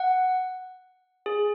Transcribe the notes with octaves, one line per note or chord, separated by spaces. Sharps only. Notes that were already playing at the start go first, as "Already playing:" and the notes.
Already playing: F#5
G#4